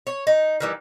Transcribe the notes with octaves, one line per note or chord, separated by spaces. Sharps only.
C#5
D#4
D#3 E3 G3